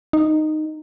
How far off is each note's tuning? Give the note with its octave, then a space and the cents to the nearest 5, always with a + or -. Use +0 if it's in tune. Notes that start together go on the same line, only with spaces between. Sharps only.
D#4 -10